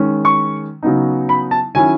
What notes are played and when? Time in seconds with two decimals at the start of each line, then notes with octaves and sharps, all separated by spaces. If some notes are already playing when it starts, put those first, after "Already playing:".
Already playing: D#3 G#3 C#4
0.25 C#6
0.83 C#3 F#3 B3 D#4
1.29 B5
1.51 A5
1.75 D#3 F#3 C#4 E4 G#5